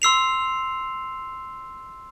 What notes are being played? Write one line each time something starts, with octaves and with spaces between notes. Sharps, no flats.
C6 E6 C7 F7